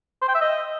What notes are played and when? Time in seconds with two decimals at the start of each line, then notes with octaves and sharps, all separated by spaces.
0.22 C5
0.28 G5
0.35 E5
0.41 D#5